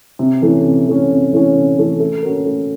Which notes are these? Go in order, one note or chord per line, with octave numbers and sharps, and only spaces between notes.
C3
E3 A3 C#4
C3
E3 A3 C#4
C3
E3 A3 C#4
C3
E3 A3 C#4
A3
C#4 F#4 A#4
A3